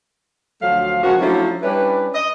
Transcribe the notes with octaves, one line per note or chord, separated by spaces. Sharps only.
D2 F3 F#3 A3 F5
C#3 F3 G#3 A#3 F#4
F3 F#3 A3 C#4 D4 E4
G3 C#4 D4 E4 B4
D#5